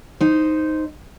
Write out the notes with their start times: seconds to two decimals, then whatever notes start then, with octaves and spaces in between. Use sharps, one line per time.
0.21 D#4 C5